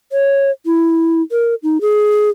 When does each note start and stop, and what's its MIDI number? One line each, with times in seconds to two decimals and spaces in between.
0.12 0.50 73
0.66 1.22 64
1.32 1.55 70
1.63 1.81 63
1.81 2.30 68